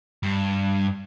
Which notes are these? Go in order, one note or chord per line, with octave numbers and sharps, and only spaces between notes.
G2